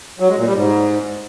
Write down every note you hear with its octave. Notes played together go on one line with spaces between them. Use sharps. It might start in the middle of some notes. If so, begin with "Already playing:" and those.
F#3
G#3
A#2
G3
G#2